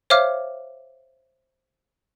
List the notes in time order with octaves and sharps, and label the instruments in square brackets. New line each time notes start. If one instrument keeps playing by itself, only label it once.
[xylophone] C5 C#5 E5 F5 D6 F6